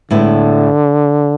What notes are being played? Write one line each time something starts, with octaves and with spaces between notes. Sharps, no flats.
A2 D3 G#3 B3 E4